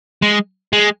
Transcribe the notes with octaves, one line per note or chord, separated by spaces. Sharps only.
G#3
G#3